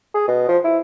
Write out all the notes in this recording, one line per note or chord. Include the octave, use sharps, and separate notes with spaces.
G#4
B2
F3
E4